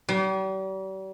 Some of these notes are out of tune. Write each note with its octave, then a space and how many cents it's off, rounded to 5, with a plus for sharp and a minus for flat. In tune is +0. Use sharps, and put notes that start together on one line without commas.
G3 -40